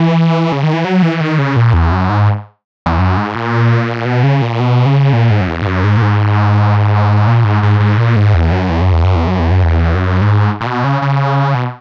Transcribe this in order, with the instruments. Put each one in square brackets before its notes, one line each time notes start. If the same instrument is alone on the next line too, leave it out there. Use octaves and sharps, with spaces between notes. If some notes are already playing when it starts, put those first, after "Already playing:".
Already playing: [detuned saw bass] E3
C#3
D#3
E3
F#3
E3
D#3
C#3
A#2
E2
F#2
G#2
E2
F#2
G#2
A#2
B2
C#3
A#2
B2
C#3
A#2
G#2
F#2
E2
G#2
F#2
G#2
A#2
G#2
A#2
G#2
G#2
G#2
A#2
G#2
E2
F#2
E2
F#2
E2
F#2
E2
F#2
E2
F#2
E2
F#2
G#2
A#2
B2
C#3
C#3
B2